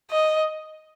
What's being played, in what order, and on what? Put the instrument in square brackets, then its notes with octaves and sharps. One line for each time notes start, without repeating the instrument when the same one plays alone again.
[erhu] D#5